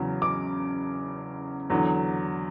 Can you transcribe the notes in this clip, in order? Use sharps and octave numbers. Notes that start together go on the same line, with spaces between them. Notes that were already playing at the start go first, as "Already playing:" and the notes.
Already playing: E2 C#3 F#3
D6
E2 D3 F#3